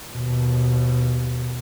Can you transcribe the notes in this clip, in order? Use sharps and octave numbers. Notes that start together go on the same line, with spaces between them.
D#2 B2